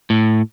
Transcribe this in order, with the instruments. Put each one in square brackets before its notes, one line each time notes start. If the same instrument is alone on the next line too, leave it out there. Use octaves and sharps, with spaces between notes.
[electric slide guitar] A2